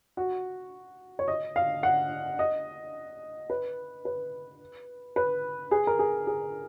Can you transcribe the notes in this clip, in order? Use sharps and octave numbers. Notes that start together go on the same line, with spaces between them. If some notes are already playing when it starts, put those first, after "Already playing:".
F#4
C#5
D#5
F5
F#5
D#5
B4
B4
B4
G#4
A#4
G#4
G#4